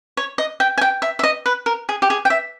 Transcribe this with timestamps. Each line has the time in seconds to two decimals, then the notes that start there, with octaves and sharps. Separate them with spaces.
0.17 C#5
0.38 D#5
0.60 G5
0.78 G#5
0.81 G5
1.02 E5
1.19 E5
1.23 D#5
1.46 B4
1.66 A#4
1.89 G#4
2.02 G4
2.10 G#4
2.25 G5
2.30 E5